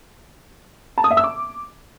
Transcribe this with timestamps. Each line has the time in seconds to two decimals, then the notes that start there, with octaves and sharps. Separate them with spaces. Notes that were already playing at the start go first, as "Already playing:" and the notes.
0.98 A5
1.04 D#6
1.11 E5
1.17 E6
1.24 D6